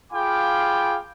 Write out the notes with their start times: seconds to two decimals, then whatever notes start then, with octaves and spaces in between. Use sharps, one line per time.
0.12 F4 G#4 F5 G5 B5 D6